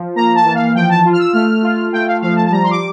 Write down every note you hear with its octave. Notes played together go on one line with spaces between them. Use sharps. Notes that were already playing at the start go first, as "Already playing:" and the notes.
Already playing: F3
A#3 A#5
A5
E3
F5
F3 G5
A5
F4
F6
E6
A3 F6
F4
A3 G5
F5
F3 F5
A5
A5
G3 A#5
C6
D6